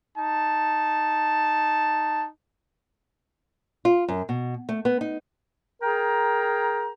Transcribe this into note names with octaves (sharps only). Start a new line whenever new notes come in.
D#4 A5
F4
F#2
B2
A3
B3
D#4
G#4 A#4 G5 A#5